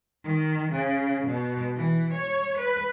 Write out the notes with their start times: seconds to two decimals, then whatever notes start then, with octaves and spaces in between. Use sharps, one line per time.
0.25 D#3
0.72 C#3
1.27 B2
1.76 E3
2.14 C#5
2.58 B4